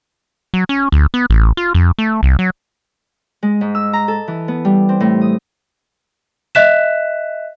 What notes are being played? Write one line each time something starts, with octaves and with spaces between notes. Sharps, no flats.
F#3
C#4
D2
B3
A1
F4
F2
A3
C2
F#3
G#3
G#2
E6
A#5
A4
E3
B3
G3
C4
A2
D#6
D#5 E5 F#6 B6 E7